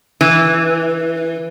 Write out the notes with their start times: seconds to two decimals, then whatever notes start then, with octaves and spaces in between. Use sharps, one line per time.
0.21 E3